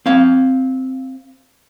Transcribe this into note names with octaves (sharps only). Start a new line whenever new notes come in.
C4 F5